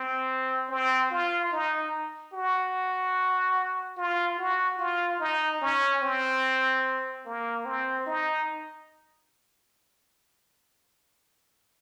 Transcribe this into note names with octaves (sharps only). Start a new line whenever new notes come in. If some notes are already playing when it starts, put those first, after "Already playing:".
Already playing: C4
C4
F4
D#4
F#4
F4
F#4
F4
D#4
C#4
C4
A#3
C4
D#4